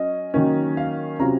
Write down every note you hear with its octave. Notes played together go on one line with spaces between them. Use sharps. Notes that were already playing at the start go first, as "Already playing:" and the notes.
Already playing: F#3 C#4 D#5
D#3 F#3 A#3 C#4
F5
C3 F#3 C#4 F4 A#5